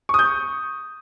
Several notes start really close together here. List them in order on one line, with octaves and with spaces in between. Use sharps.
C#6 D#6 G6